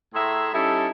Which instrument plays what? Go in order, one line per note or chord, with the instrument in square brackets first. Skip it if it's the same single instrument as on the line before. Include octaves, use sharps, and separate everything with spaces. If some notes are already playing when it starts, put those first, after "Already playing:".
[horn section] A2 A3 G#4 E5 A#5 C6
G3 C#4 D#4 E4 A4